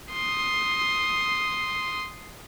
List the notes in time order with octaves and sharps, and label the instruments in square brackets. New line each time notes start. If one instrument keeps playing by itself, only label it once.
[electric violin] C6 D#6